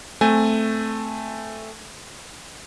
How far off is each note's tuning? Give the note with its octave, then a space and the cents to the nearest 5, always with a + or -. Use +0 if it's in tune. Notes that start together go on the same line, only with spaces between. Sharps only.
A3 +0 C4 -5 G#5 +0